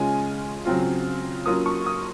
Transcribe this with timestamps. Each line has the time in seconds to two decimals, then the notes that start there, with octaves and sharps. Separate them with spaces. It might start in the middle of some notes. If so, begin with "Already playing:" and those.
Already playing: C#3 G#3 C#4 F4 G#5
0.66 C#3 F#3 C4 F4
1.46 F#3 A#3 C#4 F4 D#6
1.66 C#6
1.86 D#6